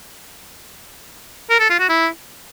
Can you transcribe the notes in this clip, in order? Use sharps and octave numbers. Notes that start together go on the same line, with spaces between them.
A#4
A4
F4
F#4
E4